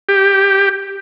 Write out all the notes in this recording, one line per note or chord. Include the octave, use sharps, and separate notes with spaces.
G4